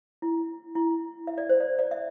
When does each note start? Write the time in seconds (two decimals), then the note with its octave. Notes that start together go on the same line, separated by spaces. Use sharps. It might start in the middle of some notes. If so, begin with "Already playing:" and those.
0.22 E4
0.75 E4
1.27 E5
1.38 D5
1.49 C5
1.60 D5
1.79 D5
1.91 E5